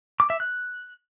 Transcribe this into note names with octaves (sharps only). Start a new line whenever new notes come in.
D6
E5
F#6